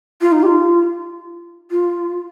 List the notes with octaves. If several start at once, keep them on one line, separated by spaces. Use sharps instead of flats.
F4
D#4
G4
F4
F4